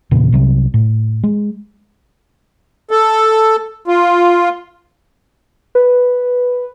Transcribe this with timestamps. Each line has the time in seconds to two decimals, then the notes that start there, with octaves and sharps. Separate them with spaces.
0.11 E2 A#2 C#3 E3
0.32 C2 C3 F#3
0.74 A2
1.24 G#3
2.91 A4
3.88 F4
5.75 B4